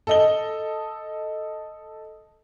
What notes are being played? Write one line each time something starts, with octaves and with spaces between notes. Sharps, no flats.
A4 D#5 G7